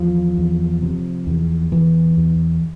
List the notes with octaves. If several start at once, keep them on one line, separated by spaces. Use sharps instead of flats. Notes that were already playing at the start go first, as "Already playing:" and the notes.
Already playing: E2 F3
E2
C3
E2
E2 E3
E2